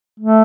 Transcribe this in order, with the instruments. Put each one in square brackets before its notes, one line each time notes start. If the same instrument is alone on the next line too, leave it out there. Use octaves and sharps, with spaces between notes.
[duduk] A3